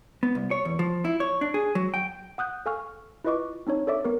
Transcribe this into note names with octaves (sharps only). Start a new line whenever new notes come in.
B3
C2
C#5
E2
F3
E4
C#5
D4
G#4
F#3
G5
F#5 D#6 F#6 G6
A4 F5 G#5 C#6 F6
E4 F4 B4 D#5 C#6 D6
C4 D4 D#4 C#5
A4 C#5 D5 E5 D6
B3 A#4